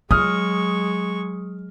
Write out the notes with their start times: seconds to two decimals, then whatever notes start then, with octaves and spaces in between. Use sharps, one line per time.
0.11 F#3 G#3 C#6 D#6 F6